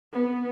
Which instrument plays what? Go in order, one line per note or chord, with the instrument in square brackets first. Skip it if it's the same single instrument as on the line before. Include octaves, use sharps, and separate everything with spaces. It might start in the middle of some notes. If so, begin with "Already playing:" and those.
[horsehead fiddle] B3